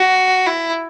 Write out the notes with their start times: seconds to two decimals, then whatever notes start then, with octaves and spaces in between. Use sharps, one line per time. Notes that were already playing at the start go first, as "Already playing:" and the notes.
Already playing: F#4
0.46 E4